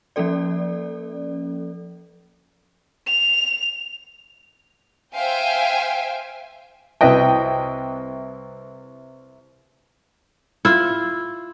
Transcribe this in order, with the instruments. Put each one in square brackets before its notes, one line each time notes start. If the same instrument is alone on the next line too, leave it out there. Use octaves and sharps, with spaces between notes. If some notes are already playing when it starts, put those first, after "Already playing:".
[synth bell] F3 A#3 C#4 A4 D5
[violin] F7
[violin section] C5 E5 F5 G5 G#5
[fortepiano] C2 E4 B4 D#5 G5
[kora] E4 F4